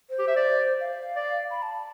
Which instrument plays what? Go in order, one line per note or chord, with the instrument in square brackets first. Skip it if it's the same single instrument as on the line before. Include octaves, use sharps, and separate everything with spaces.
[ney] C5
[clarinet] G4
E5
D5
[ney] F5
[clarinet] D5
[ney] B5
A5
A5